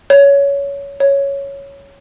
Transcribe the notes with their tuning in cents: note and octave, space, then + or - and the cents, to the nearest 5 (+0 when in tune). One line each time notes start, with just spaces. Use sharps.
C#5 +20
C#5 +5